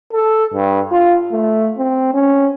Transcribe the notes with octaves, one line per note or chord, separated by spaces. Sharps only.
A4
G2
F4
A3
C4
C#4